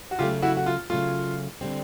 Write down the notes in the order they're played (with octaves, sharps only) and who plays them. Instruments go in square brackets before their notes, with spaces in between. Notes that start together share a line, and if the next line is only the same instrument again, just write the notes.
[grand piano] F#4
[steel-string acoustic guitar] C#3 F#3 A3 [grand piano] F4 G4
[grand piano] E4 F#4
F#4
F4
[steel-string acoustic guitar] C#3 F#3 A3 [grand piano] F4
[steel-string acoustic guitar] D3 G3 C4